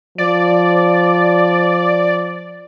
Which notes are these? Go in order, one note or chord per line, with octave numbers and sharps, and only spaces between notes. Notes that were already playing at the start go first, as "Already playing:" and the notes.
F3 D5